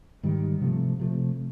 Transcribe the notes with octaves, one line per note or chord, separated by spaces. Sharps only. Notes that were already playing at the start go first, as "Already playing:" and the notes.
G#2 D#3 G3
C3 F3 A3
C3 F3 A3